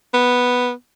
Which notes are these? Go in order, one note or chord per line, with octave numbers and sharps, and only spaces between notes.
B3